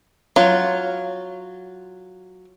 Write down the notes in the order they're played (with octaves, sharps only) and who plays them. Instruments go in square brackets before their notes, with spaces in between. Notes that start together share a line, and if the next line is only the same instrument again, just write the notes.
[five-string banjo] F#3 F4